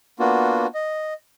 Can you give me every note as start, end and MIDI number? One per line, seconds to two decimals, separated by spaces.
0.19 0.66 58
0.19 0.66 59
0.19 0.66 62
0.19 0.66 65
0.19 0.66 66
0.74 1.14 75